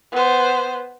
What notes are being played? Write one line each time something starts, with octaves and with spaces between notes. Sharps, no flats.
B3 C5